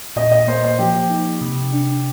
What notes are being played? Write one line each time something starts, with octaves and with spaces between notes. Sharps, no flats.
A#2 D#5
D#5
A#3 C5
C5
F3 G4
D#4
C3
D4